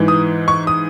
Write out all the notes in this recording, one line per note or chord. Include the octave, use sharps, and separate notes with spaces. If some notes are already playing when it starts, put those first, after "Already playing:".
Already playing: G#2 E3
D#6
C#6
D#6